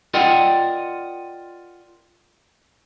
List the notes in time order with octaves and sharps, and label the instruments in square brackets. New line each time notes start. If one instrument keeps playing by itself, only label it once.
[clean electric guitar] F4 A#4 D5 D#5 F#5 G5